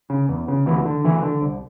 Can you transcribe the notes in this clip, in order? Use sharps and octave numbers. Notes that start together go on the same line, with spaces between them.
C#3
E2
C#3
D2 E3
D3
D2 E3
D3
C2